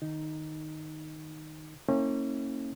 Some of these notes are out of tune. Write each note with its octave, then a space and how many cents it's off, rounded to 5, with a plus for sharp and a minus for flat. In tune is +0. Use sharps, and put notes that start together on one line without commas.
D#3 -15 D#4 +0
A#3 -35 C#4 -30 E4 -45